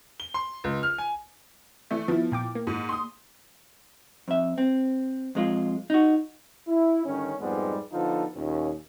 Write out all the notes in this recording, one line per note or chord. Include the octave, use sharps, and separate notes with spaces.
G7
C6
C#2
F6
G#5
E3 A3
F3 B3 E4
A#2 G5 D6
A#3
G#2
C6 D#6
F2 E5
C4
F2 G#3 F4
D#4 F#4
E4
G2 D3 D#3 C#4
F2 G#2 G3 G#3 B3
D3 F3 B3 D#4 F4 A4
D#2 A#2 C#4